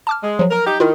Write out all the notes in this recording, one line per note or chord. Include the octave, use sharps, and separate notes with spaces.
A5 D6 F6
G#3
F3 F#3
A#4
D#4 G4
D#3 E4 F4 A#4